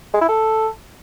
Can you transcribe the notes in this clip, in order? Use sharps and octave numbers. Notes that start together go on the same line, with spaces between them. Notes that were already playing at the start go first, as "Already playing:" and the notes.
G#3
E4
A4